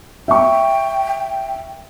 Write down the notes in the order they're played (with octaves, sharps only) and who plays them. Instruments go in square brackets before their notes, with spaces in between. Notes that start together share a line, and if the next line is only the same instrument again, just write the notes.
[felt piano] E5 C#6 [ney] G5